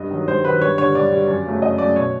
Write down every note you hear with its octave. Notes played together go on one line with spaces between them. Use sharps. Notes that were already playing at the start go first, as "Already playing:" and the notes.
Already playing: G2 D#5
D#3 F#3
G2 C5
D#3 F#3 B4
G2 C#5
D3 G3 C#5
G2 D5
D3 G3
F#2
C#3 F#3 A3
F#2 D#5
C#3 F#3 A3 D5
B2 C#5